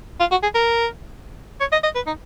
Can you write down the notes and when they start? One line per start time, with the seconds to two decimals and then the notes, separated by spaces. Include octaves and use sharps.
0.20 F4
0.31 F#4
0.43 G#4
0.55 A#4
1.60 C#5
1.72 D#5
1.83 D#5
1.95 B4
2.07 D#4